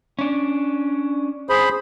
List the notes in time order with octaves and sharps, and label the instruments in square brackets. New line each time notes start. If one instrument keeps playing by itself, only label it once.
[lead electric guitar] C#4 D4
[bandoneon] G#4 C5 B5